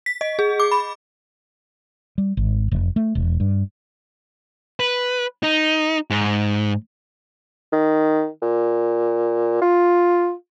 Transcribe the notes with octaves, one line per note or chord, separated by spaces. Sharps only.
B6
D#5
G#4
D6
B5
G3
G#1
F1
A3
E1
G2
B4
D#4
G#2
D#3
A#2
F4